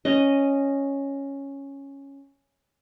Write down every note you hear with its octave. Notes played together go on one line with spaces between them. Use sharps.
C#4 D#5